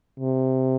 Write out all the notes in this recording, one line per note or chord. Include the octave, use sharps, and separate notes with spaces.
C3